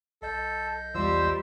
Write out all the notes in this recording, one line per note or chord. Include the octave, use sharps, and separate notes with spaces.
B1 A4 D#5 G6
E2 G3 F4 C5 D5 E6